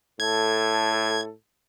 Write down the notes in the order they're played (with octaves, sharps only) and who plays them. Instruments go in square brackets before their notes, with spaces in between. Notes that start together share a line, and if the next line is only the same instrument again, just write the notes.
[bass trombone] A2 [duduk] A4 [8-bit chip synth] G#6